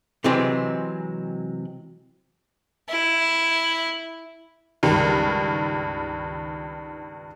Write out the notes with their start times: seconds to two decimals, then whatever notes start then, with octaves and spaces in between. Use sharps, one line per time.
0.24 C3 E3 F#3 G#3 C4
2.89 E4
4.83 C#2 G2 D#3